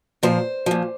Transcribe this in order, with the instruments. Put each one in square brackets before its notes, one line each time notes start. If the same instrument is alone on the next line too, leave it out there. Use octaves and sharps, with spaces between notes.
[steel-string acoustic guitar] A#2 F3 C5
A#2 F3